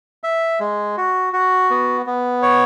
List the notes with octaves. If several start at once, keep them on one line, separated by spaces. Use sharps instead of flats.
E5
G#3
F#4
F#4
B3
B3
C#5